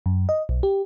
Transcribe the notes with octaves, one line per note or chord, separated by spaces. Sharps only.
F#2
D#5
B1
G4